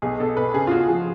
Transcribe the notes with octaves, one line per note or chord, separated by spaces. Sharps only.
B1 G#4
B2 A4
B2 B4
C#3 G#4
F4
C#3 F#4
F3 G#4